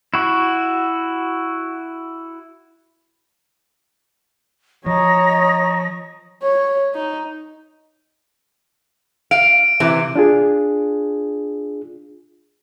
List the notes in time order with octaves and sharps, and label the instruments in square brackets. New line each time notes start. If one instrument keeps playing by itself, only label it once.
[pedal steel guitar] E4 F#4
[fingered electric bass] F3 [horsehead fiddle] C#5 [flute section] D#5 A#5 D#6 [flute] A#6
[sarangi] C#5
D#4
[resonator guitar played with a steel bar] F5 [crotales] D7
[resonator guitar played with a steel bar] C3 E3
[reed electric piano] D4 F4 G#4